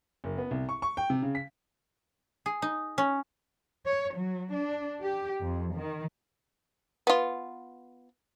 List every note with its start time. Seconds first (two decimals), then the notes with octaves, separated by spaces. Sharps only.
0.24 F#1
0.38 B3
0.51 C2
0.69 C#6
0.82 C#6
0.97 G5
1.10 C3
1.22 C#3
1.35 B6
2.46 G#4
2.62 D#4
2.98 C#4
3.86 C#5
4.18 F#3
4.54 D4
5.02 G4
5.41 F2
5.76 D#3
7.07 B3 F4